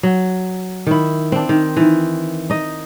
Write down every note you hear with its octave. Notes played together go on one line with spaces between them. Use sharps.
F#3
D#3 E4
C4 D4
D#3
D#3 E3
D#4 D#5